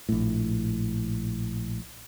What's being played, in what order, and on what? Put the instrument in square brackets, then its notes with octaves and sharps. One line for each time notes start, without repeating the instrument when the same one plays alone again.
[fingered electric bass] A#1 A2